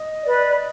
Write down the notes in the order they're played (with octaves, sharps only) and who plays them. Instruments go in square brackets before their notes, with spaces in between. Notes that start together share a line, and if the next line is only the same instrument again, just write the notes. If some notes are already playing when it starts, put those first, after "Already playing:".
Already playing: [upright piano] D#5
[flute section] B4 D5